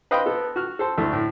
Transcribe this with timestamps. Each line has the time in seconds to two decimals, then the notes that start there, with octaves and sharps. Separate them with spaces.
0.11 B4 C5 D#5 F5 G5 B5
0.26 B3 A4
0.56 F#4 F6
0.79 A4 C5 A5
0.98 D2 A3 E4
1.13 A2